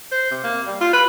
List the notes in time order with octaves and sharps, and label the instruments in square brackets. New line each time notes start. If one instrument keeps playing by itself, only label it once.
[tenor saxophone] C5
C3
A#3
G3
F4
B4